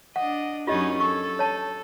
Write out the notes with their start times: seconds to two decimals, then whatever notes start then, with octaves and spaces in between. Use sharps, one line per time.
0.16 D4 D#5 F#5
0.67 F#2 C#4 D#4 F4 G4 D#5
1.00 A4 C#6
1.39 C#5 A5